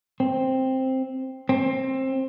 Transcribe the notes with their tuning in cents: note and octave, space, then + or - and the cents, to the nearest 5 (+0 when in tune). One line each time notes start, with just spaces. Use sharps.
C4 +5
C4 +20